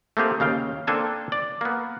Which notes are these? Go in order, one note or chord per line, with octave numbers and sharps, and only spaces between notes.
A3 A#3 C4 G4 G#4
D#2 C#3 F5 G5
A#3 C4 D4 A4 G#5 A5
D5
A#3 B3